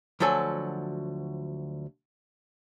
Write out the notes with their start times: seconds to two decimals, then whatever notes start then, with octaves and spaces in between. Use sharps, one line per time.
0.20 D2 F3 F#3 A4 G#5